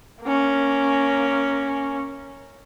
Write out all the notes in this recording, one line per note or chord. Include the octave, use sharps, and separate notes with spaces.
A#3 C#4